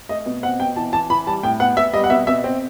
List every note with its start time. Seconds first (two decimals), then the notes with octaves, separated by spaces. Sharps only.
0.09 A3 D#5
0.26 B2
0.43 C4 F#5
0.60 B2 G5
0.76 E3 A5
0.93 E3 A5
1.10 E3 B5
1.27 G3 A5
1.43 A2 G5
1.60 B3 F#5
1.77 B3 E5
1.94 G3 D#5
2.04 F#5
2.10 B2 E5
2.27 B2 E5
2.44 C4